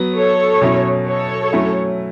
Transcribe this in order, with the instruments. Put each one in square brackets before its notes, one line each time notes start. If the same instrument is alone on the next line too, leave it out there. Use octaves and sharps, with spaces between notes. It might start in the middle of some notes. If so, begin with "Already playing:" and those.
Already playing: [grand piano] F#3 B3
[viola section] A4 C#5
[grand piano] B2 F#3 C#4 E4
[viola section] A4 C#5
[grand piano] F#3 A3 C#4 E4